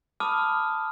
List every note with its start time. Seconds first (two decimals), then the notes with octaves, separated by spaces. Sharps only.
0.20 A5 B5 D6 D#6 F6